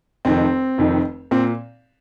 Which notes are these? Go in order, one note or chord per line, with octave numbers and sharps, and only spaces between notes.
F1 F2 D#3 C4
F1 F2 D#3
A#2 C4